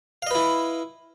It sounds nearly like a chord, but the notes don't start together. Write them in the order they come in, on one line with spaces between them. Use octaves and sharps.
F5 D#5 B4 E4